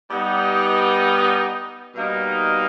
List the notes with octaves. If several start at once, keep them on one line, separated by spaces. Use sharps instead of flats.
G3 B3 D#4
B2 G3 A#3 D#4